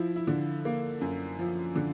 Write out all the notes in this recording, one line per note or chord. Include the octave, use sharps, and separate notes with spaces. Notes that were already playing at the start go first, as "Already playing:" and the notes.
Already playing: F3 E4
E4
D3
A#3
F#2
F3
D3